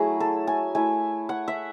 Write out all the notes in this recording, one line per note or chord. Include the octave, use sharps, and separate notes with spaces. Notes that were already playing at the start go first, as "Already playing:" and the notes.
Already playing: F#3 A3 E4 G#4
A4
G#5
A3 E4 G#5
F#5
E5